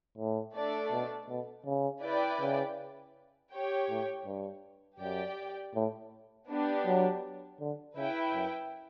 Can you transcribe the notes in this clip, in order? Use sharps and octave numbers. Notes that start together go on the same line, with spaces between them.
A2
A3 D4 A4 D5
B2
B2
C#3
E4 B4 D5 G5
C#3
G4 C#5 G5
A2
G2
F#2 G4 D5 G5
A2
B3 D4 G4
F#3
D3
C#3 E4 B4 E5 G5
F#2